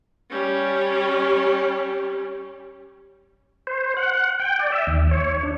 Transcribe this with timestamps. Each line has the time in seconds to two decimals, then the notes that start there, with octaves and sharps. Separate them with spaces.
0.31 G3 C#4
3.67 C5
3.97 F#5
4.40 G5
4.59 D5
4.72 E5
4.87 D#2
5.11 C#5
5.43 D4